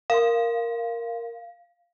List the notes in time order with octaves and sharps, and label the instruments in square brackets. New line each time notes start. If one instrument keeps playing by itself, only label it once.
[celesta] A#4 C6 [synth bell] F5